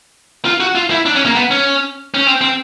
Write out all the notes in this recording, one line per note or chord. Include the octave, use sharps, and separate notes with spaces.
F4
F#4
F4
E4
D4
C#4
A#3
B3
C#4
C#4
C4
C4